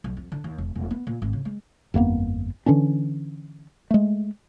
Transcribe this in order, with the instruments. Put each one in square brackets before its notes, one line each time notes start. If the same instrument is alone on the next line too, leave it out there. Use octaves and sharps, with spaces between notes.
[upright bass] B1
F2
D3
D#2
E1
E1
B3
A#2
G#1
C#3
G#3
[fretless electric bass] G1 F2 A#3 B3
D3 E3 C#4 D4
G#3 A3